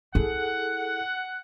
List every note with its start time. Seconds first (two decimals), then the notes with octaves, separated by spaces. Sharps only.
0.15 E4 G#4 A4 F#5